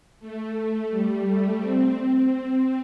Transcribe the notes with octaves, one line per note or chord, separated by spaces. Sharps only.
A3
G3
A3
C4
C4